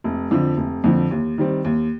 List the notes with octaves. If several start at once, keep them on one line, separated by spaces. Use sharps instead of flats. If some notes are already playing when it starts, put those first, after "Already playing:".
F1
F2 D3 F3
F1
F2 D3 F3
D#2
D#3 G3 C4
D#2